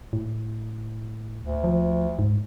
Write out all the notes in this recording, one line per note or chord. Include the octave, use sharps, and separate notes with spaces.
A2
D2
F3
G#2